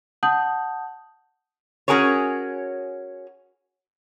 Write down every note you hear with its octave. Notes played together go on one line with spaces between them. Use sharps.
F#5 A5 D#6 G6 F#7
C#4 F#4 G#4 A#4 C#5